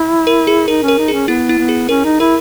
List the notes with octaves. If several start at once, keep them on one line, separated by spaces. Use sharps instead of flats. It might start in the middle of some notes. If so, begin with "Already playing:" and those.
Already playing: E4
A#4
G#4
D#4 A#4
C#4
A#4
D#4
C#4 G#4
B3 E4
E4
B3
G#4
C#4 A#4
D#4
E4 A#4